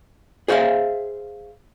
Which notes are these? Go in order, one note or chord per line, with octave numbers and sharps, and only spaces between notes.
G#4 C5 C#5 E5 F5